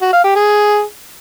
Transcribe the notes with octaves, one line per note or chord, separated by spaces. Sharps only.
F#4
F5
G4
G#4